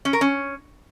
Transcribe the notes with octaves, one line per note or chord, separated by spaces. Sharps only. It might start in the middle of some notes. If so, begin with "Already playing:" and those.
C#4
A#4
C#4